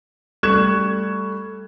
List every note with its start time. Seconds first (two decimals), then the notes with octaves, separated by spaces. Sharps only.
0.43 G3 A3 C#6 F#6 G#6 E7